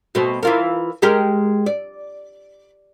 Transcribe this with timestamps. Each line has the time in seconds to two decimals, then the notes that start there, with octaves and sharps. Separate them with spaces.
0.15 B2 A3 C4
0.43 E3 F4 A#4
1.02 G#3 G4 A#4
1.66 D5